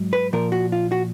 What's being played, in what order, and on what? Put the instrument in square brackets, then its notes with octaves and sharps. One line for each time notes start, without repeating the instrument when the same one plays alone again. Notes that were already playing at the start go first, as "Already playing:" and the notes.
Already playing: [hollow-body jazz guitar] G#2 F#3
B4
A#2 F3 A#4
F#4
F4
F#4